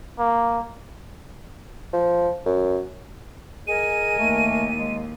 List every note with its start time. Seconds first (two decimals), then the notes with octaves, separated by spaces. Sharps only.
0.19 A#3
1.93 F3
2.46 F#2
3.67 G#4 A#4 D#5 G#5 D#7
4.19 D#2 A3
4.77 G#3